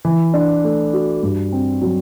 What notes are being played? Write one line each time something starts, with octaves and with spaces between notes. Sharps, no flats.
E3
D4
A3
F#4
G2
C4
F#3